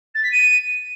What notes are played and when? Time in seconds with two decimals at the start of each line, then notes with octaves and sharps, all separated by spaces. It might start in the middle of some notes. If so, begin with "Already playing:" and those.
0.14 A6
0.23 B6
0.32 D#7